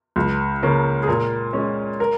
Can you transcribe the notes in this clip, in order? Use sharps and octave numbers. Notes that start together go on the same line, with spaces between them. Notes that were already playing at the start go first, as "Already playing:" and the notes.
C#2
C#3 A#3 C#4
G#4
A#2 A#4
G#3 C#4
A#4